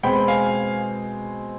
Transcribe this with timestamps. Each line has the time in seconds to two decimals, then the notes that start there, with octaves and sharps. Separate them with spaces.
0.03 B2 G#3 C4 G5 B5
0.28 F5 G#5